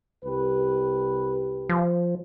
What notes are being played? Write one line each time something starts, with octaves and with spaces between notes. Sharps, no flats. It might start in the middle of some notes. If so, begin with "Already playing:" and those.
C2 G4 B4
F3